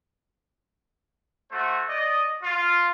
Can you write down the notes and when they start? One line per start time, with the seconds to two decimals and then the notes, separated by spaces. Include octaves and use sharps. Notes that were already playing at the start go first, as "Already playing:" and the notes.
1.50 A3 F#4 C5
1.89 D5 D#5
2.42 F4